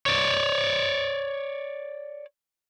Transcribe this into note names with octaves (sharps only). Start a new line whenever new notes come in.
C#5 D5